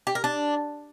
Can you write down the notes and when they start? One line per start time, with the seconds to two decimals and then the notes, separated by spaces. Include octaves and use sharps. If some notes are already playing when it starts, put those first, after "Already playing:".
0.07 G4
0.15 A#4
0.24 D4